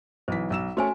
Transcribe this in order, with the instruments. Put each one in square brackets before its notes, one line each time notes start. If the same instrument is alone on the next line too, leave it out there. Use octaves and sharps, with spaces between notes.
[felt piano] B1 E3 B6 [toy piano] C5
[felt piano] B1 E6 E7
[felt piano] A3 C#4 [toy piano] F#4 C5 G#5